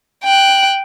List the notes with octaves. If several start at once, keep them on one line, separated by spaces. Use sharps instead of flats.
G5 F#6